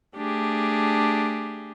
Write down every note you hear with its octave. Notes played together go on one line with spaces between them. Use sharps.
A3 D4 G4 G#4